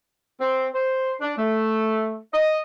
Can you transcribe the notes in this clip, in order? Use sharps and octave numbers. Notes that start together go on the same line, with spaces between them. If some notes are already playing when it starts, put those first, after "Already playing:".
C4
C5
D4
A3
D#5